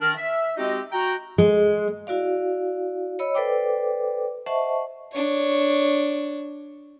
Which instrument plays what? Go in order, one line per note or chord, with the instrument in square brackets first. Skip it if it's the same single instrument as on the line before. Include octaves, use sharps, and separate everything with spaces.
[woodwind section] D#3 D4 A#4 F6
E5
G#3 C4 D#4 F#4 G4 D#5
F#4 G5 A#5
[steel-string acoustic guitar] G#3
[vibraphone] E4 F#4 D5 F5
C#5 D#5 B5 E6
A4 B4 C5 D5 G5 D6
C5 D#5 E5 F#5 A5 C#6
[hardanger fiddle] D4 C#5